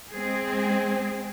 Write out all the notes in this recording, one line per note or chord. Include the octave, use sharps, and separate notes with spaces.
G#3 C4 G#4